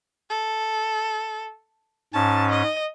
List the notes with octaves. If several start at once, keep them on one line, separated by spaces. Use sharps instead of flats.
A4
G#2 C#4 A5
D#5